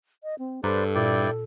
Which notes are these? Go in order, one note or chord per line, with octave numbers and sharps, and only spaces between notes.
D#5
C4
G2 A4 B4 C5 D5 A#5
A#2 E4 F4 D5 G5